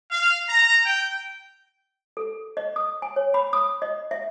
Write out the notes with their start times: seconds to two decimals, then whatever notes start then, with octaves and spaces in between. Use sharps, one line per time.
0.11 F5
0.48 A#5
0.86 G5
2.17 A4
2.57 D#5
2.76 D#6
3.02 G#5
3.16 C#5
3.34 B5
3.53 D#6
3.82 D#5
4.11 E5